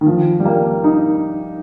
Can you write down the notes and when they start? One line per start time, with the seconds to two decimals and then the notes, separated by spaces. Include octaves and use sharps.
0.01 D#3
0.06 F3
0.40 G3
0.45 A#3
0.84 D#4